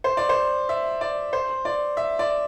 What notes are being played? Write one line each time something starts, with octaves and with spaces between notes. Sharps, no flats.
C5
D5
C5
E5
D5
C5
D5
E5
D5